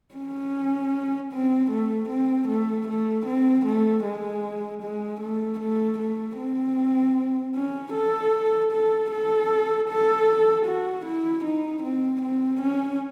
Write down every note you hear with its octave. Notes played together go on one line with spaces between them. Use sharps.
C#4
C4
A3
C4
A3
A3
C4
A3
G#3
G#3
A3
A3
A3
C4
C#4
A4
A4
A4
A4
F#4
E4
D#4
C4
C4
C#4